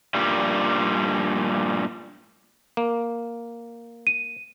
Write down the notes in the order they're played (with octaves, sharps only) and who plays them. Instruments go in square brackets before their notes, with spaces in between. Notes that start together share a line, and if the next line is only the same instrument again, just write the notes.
[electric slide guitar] G2 A#2 G3
[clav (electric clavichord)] A#3
[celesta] D#7